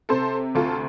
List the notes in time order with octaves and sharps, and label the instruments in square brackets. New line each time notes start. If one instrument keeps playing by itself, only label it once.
[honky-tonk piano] C3 A4 C5
D2 F4 A4